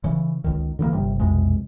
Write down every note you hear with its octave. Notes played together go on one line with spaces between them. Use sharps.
C#3 E3
C#2 D#3
D3 E3 G3 A#3
G1 C3 G3
B1 F2 C3 G#3